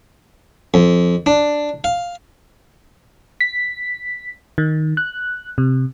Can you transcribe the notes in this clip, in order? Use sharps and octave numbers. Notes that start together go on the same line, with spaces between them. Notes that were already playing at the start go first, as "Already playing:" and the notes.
F2
D4
F5
B6
D#3
F#6
C3